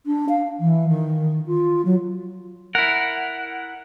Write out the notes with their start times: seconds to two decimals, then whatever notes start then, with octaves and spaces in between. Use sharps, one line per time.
0.06 D4
0.29 F5
0.59 E3
0.88 D#3
1.46 F4
1.85 F#3
2.75 E4 A#4 F#5